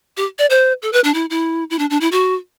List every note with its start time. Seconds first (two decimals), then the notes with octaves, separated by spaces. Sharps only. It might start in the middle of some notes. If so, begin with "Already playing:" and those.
0.17 G4
0.39 D5
0.50 C5
0.82 A4
0.93 B4
1.04 D4
1.14 E4
1.30 E4
1.70 E4
1.79 D4
1.90 D4
2.01 E4
2.12 F#4